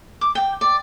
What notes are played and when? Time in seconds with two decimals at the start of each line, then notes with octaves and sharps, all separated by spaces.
0.21 D6
0.35 G5
0.61 D5